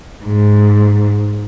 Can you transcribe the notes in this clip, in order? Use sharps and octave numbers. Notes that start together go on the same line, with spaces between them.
G#2